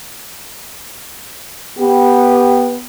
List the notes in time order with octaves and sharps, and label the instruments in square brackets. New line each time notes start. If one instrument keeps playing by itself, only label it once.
[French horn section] B3 G4